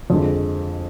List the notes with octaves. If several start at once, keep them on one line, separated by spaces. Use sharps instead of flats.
F2 D3 G#3